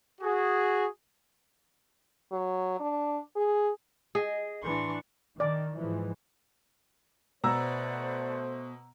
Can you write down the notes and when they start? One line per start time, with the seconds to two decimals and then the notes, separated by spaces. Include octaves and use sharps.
0.21 F#4 G#4
2.32 F#3
2.80 D4
3.36 G#4
4.15 G#4 D#5
4.63 A2 E3 D4 C6 C#6
5.40 D#3 D5
5.78 G#2 E3 F3
7.44 B2 A3 B4 C5 D5 F#5 A#5 E6